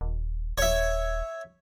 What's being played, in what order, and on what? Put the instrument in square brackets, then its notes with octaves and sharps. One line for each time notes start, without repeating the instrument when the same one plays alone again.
[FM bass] D#1
[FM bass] D#1 [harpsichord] C#5 E5